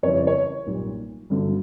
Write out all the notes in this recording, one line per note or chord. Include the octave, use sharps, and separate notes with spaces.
F2 C#3 E3 G3 C#5
D5
C#5
B1 A#2 G3
G1 G2 D3 F#3